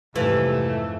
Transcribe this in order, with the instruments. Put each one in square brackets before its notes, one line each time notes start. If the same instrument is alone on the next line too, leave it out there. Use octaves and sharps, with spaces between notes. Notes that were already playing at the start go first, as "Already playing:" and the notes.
[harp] F2 G#2 [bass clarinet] C3 [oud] E3 [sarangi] A3